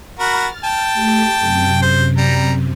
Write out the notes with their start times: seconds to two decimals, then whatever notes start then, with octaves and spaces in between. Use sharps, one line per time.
0.20 F#4 A#4 B5 F6 A6
0.64 G5 A5
0.94 A3 G4
1.39 F#2 C3
1.82 C5
2.18 G3 A#5